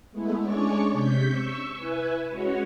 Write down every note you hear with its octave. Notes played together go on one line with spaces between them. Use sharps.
G#3 A3 B3 E4
G#3 C#4 D4 C#5 D5 C#6
C3 G6 B6
C#6 E6
E4 B4 G#5
G#3 C#4 F#4 C#5